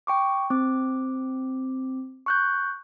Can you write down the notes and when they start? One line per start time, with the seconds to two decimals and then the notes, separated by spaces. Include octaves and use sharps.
0.07 G5 C#6 D6
0.50 C4 D6
2.26 C#6 F#6 G6